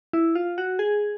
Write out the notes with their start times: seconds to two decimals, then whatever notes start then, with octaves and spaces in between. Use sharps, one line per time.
0.13 E4
0.35 F4
0.58 F#4
0.79 G#4